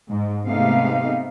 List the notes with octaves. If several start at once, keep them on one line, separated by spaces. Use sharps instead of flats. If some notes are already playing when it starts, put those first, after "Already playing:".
G#2
C3 G#3 A3 B3 D#4 F5